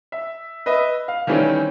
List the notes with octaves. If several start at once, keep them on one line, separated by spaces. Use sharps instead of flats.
E5
B4 D#5 E5
F5
D#3 E3 G3 A3 C4 C#4